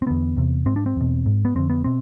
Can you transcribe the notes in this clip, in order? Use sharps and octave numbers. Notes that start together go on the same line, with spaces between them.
C4
E2 D3 B3
E2 C3
G#2 C4
D4
C4
E2 B2
G#2
B3
F2 D3 C4
B3
B2 C4